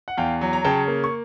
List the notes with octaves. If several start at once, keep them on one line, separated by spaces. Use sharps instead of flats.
F#5
E2 F5 G5
F#3
A#5
C#3 G5 A5
A#3
C#6